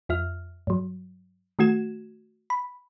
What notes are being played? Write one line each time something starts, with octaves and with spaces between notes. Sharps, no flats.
F2 F4 E5 F6
G2 F#3
D#3 A3 F#4 G#6 E7
B5